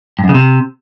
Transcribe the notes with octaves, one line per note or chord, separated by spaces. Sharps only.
G2
F#2
C#3
C3